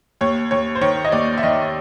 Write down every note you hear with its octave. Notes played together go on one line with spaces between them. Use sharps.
D#2 C#5
D#2 C#5
C5
D#3 C#5
D#5
D#2 D5
E5
D#3 D#5